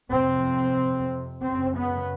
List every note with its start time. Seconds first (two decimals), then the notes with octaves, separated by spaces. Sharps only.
0.10 F2 C3 C4
1.43 F#2 C#3 C4
1.77 B3